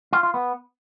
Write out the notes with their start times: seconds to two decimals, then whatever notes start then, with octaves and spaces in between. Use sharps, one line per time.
0.13 F4
0.23 F4
0.34 B3